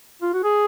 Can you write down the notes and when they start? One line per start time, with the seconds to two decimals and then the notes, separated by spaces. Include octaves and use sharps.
0.22 F4
0.34 F#4
0.44 G#4